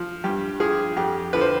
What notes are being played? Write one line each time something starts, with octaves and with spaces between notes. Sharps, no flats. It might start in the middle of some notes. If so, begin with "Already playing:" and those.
Already playing: F3
G2 G4
F3 G#4
F2 G4
D3 F3 B4
C5